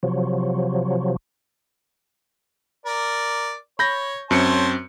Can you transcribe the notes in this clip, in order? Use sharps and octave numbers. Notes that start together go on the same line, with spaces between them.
C3 F3 F#3
A#4 D5
C#5 B5 G6 A#6
F#2 C4 C5 C#5 A5 C#7